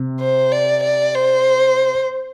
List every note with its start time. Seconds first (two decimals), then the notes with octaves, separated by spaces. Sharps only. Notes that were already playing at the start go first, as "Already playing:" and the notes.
Already playing: C3
0.20 C5
0.52 D5
0.83 D5
1.15 C5